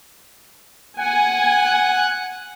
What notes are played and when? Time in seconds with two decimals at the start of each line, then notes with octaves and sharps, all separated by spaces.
0.99 F#5 G#5